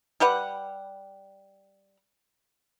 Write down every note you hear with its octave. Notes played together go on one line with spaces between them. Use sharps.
G3 G4 B4 F#5